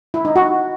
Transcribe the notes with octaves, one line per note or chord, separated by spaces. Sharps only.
E4
D#4
F#4